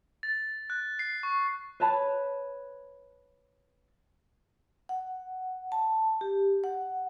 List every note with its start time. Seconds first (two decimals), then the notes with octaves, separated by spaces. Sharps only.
0.23 A6
0.70 F#6
0.99 C7
1.23 C#6
1.80 B4 C#5 A5 B5
4.89 F#5
5.72 A5
6.21 G4
6.64 F#5